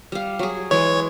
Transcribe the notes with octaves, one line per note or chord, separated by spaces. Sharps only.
G3 F5
F#3 G#4
E3 G#3 C#5